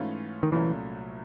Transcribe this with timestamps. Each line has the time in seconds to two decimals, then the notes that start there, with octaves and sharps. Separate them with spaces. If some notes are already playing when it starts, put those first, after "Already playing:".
Already playing: G#2 E3 A3 C#4 F4
0.43 D#3
0.52 C2 A#2 E3 F#3 A3 C#4